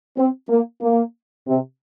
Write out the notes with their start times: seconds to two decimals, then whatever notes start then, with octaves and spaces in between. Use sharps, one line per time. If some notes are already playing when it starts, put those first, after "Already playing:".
0.18 C4
0.50 A#3
0.82 A#3
1.47 C3